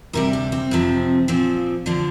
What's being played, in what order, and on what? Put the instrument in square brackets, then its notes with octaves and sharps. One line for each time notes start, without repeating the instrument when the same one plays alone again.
[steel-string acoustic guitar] D2 C3 G3 A#4
D4
C4
F2 C3 F3
A#2 F3 C4
D3 F3 D4